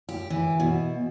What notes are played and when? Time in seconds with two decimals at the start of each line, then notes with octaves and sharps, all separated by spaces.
0.09 G4
0.30 E3
0.60 B2